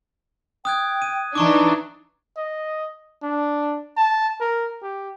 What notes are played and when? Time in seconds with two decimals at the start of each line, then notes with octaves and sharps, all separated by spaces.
0.65 G5 D#6 F#6 G#6
1.02 D#7
1.35 E3 D4 D#4 A#5 C#6 D6
2.37 D#5
3.23 D4
3.97 A5
4.40 A#4
4.83 G4